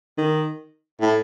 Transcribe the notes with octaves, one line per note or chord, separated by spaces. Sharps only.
D#3
A2